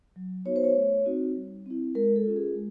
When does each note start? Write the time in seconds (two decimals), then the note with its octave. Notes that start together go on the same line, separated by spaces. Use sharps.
0.16 F#3
0.45 B3 D#4 F#4 C#5
0.56 C5
0.64 C#5
0.75 A3
1.06 C4 D#4 F#4
1.36 G3
1.66 C4 E4
1.95 G#3 A#4
2.16 A4
2.26 C#4 F4
2.36 G#4
2.55 G#3